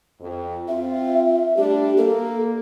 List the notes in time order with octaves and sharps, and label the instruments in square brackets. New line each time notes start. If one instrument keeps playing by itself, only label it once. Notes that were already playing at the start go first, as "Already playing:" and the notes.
[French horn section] F2
[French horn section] C4 F4 [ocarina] E5
[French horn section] G3 A3 D4 [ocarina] G4
[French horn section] A#3 [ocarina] A4